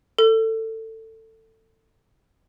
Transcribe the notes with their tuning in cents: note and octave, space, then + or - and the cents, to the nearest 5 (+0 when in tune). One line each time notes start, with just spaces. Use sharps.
A4 +20